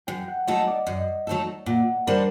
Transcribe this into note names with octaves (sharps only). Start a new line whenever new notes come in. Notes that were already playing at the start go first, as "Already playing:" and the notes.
F#2 G5
F#5
F#3 A3 D#4 A4 D#5
D5
F#2 D#5
F#3 A3 D#4 A4
A#2 F#5
G3 D4 A4 A#4 C5